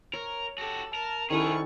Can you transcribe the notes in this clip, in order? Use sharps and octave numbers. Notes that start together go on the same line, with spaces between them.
A#4 C#5
F#4 G4 A4
A#4 A5
C2 D#3 C#4 E4 G#4 A4 B4 C#6